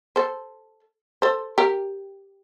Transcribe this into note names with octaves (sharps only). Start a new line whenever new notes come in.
A4 C5
A4 C5
G4 A#4